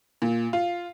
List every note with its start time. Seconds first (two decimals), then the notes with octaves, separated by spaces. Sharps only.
0.22 A#2
0.53 F4